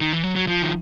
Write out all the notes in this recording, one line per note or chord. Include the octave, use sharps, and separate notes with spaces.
D#3
E3
F#3
F#3
F3
D#3